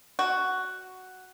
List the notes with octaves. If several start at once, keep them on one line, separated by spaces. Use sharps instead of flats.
F#4